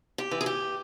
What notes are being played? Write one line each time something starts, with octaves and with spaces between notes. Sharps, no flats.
G4
E3
G#4
G4